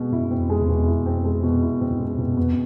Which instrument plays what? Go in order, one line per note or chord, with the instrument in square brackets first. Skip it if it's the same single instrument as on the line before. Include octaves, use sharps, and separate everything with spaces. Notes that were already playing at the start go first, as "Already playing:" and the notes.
Already playing: [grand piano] B2 G#3
[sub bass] F#2 [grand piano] E4
[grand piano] C4
[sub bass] F2
[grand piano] G#3
[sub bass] E2
[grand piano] B2
[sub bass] F2 [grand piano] E4
[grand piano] C4
G#3
B2
E4
[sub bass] F#2 [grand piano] C4
[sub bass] G2
[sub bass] F#2 [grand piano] G#3
[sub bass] F#2 [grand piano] B2
[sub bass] F2 [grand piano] B3